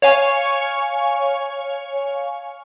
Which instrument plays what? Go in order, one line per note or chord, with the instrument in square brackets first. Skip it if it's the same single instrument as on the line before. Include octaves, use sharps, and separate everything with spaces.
[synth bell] C#5 F5 G#5 C#6